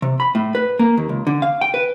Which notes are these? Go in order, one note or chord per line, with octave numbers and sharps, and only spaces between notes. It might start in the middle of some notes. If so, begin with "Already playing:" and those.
C3
B5
A2
B4
A#3
D#2
C#2
D3
F5
G5
B4